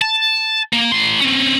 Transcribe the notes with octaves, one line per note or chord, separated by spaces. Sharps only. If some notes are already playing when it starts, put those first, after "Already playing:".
A5
A#3
A2 C6
C4 C#4